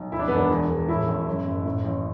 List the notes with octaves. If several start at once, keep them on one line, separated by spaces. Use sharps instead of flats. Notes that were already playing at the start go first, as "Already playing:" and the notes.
Already playing: B1
D2 E4
D4
B3
E1 D4
E2
E1
A2 E4
A1
F#2
F#1
A2
A1